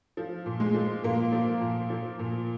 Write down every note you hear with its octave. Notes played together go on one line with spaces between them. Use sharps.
F3
A#2
G#3
F3
A#2 A#3
F3
A#2
F3
A#2